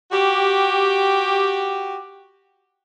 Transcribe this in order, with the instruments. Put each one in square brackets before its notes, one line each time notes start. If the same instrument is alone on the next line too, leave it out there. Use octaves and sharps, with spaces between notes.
[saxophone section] F#4 G4